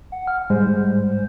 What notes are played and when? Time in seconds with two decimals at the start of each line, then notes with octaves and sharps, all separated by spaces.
0.12 F#5
0.28 F6
0.50 G#2 G3 G#3 C5